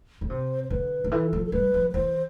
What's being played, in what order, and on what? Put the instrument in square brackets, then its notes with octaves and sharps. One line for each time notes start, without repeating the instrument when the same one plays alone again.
[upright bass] D3
[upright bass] C3 [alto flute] C5
[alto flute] C5
[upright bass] D3 [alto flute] B4
[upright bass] D3
[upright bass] E3 [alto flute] A4
[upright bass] F3
[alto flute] A4
[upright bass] G3 [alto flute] B4
[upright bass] F3
[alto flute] B4
[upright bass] E3 [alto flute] C5